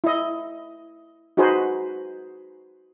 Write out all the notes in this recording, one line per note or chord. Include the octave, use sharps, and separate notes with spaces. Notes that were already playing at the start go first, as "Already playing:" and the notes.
E4 D#5
D#4 F#4 G#4 B4 C5